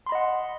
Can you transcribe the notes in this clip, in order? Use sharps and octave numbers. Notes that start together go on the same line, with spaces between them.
D#5 F#5 B5 C6